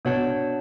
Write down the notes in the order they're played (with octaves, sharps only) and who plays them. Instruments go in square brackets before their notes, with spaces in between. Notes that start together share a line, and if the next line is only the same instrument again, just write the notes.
[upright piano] B2 [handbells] D4 F#4 C#5 F#5 A5